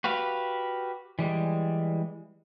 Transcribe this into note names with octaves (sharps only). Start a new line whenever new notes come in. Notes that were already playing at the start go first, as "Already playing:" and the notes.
F#4 G4 B4 F5
E3 G3 G#3